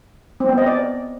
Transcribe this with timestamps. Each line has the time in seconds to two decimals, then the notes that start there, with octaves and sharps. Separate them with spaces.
0.40 C4
0.49 B3
0.58 D#5
0.66 D5